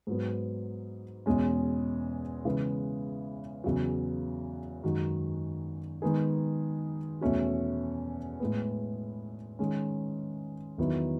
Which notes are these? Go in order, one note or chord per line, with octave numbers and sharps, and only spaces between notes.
G#2 F#3 B3
E2 B2 G#3 C#4
C#3 E3 G#3 B3 E4
E2 C#3 F#3
F#2 D#3 G#3 D#4 F#4
D#3 G#3 B3 D#4 G#4
E2 B2 A3 C#4 F#4
A2 G#3 B3
D#3 G#3 C#4
E2 D#3 F#3 B3 E4